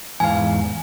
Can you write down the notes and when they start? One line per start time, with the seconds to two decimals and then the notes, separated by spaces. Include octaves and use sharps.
0.20 E2 G#2 F5 G#5